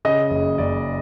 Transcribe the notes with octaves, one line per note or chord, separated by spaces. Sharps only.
C#3 D#5
F#1
F#1 D5